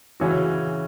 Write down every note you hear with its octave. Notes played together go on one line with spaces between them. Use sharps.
C#3 E3 C#4 F#4